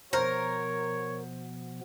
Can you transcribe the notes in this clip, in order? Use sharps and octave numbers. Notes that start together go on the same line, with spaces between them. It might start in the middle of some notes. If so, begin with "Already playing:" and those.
B2 F3 B3 A#4 C5 C#5